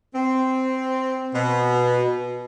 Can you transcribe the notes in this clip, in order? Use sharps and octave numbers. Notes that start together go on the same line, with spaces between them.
C4
B2